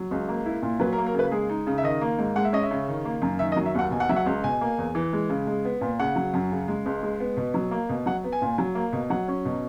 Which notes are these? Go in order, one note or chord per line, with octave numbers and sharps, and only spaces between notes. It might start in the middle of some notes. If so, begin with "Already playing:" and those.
Already playing: F#3
C#2
A#3
E4
A#2
F#3 B4
A#4
A#3
A#4
C#3 B4
G#3 G#4
D#4
C#3
E5
D#3 D#5
A#3
G#2
G#3 F#5
E5
C#4 D#5
E5
C#3
D#3
A#3
F#2
D#3 E5
D#5
F#3
E5
D#2 F#5
B2 G#5
F#5
F#3 E5
F#5
C#2
B2 G#5
A#3
E2
E3
G#3
C#3
G#3
B3
A#2
C#3 F#5
F#3
F#2
C#3
G#3
C#2
G#3
B3
B2
F#3
A#3
B2
F#3 F#5
B3
G#5
A#2
F#3
A#3
B2
F#3 F#5
C#4
B2